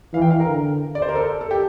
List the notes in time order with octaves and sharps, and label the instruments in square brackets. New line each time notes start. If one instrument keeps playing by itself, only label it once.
[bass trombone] E3 [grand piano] F5
[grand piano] G5
F5
A#4
[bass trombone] D3
[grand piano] D5
C5
A#4
A4
A4
G4